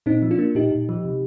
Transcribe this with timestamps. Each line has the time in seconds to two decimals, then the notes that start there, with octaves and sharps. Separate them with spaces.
0.06 A#2 C4 D#4
0.22 F3
0.31 D4 F4
0.39 A#3
0.55 A#2 D#4 G4
0.71 A#2
0.89 F3
1.05 C3